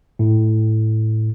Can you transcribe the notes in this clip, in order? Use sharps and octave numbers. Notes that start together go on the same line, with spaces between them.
A2